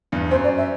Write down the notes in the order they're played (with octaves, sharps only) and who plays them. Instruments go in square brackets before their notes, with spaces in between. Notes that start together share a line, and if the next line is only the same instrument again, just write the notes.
[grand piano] E2 G2
[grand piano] F#2 [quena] C5
[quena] D5
E5